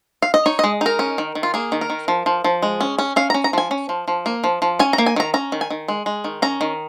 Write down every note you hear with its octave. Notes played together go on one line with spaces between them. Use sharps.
F5
D#5
D#4 C#5
G#3 D#5
D#4 A#4
C#4
D#3
D#3
F4
A#3 G#4
D#3
A#4
D#3
F3
F3
F3
G#3
C#4
C#4
C#4 F5
C#4 A#5
A#5
F3 G#5
C#4
F3
F3
A#3
F3
F3
C#4 G#5
A#5
A#3
G#5
D#3 A#5
C#4 A#5
D#3
G#5
D#3
G#3
G#3
D#3
C#4 A#5
D#3